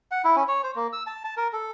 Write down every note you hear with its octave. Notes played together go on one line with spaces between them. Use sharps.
F#5
E4
C#4
C#5
C5
A#3
E6
A5
A5
A#4
A4